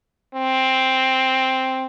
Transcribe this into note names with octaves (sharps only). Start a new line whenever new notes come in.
C4